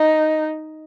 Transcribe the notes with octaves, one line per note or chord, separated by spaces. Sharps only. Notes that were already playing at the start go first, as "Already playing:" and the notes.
Already playing: D#4